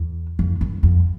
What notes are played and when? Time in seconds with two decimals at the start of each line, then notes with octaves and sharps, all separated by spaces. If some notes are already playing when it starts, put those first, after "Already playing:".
Already playing: E2
0.39 F2
0.61 F#2
0.83 F2